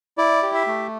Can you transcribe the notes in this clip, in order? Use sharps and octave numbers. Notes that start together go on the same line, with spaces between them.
E4 D5
G4
E5
A3